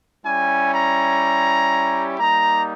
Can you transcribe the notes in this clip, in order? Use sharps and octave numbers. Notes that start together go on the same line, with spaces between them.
G3 C#4 E4 G4 G#5
A#5
G3 A#3 D#4 A#5